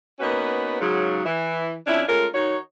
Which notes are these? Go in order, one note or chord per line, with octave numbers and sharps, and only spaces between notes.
A#3 B3 C#4 D#4 F#4 B4
G#2 C#3 F#3
E3
F2 C#4 D4 E4
G#3 A3 C#4 F4 A#4
D#3 D#4 F#4 C#5